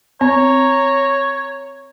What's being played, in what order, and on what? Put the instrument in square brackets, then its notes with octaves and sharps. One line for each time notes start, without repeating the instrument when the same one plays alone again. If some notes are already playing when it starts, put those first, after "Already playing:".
[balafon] C4 [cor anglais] C#5 [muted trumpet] A#5